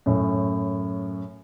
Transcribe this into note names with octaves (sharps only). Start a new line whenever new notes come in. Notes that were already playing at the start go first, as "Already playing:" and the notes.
F#2 A2